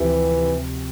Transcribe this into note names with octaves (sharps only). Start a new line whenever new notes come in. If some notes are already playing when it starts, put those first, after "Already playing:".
Already playing: D2 C3 E3 F3 C4 G4